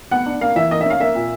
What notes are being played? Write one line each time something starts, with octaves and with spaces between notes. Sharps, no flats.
B3 F#5
D4
A#3 F5
E3 E5
A#3 D#5
E5
C#4 F5
A#3 E5
A#2